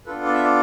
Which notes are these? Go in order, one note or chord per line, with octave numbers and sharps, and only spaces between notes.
B3 D4 F4 A4 B4
D5
E5
D5